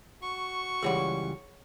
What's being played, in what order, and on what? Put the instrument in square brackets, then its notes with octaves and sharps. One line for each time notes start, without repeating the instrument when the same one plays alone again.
[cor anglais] F#4 [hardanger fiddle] C#6
[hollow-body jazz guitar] C#2 E3 G3 [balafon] G#4 C#5 F#5